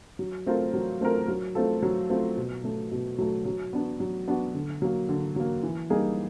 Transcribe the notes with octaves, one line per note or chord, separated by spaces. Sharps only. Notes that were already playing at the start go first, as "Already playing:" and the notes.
F#3
A3 C4 F4 A#4
F#3
A3 C4 F4 A#4
F#3
A3 C4 F4 A4
F#3
A3 C4 F4 A4
B2
F#3 A3
B2
F#3 A3
F#3
B3 D4 F#4
F#3
B3 D4 F#4
D3
F#3 A#3
D3
F#3 A#3
E3
G3 A#3 D#4 G#4